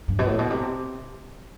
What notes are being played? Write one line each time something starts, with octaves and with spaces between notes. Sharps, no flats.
G2
B2
A2
B2
C3